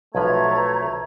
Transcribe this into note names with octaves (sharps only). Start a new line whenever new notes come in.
B1 F3 A3 B4 E5 A#5 G#6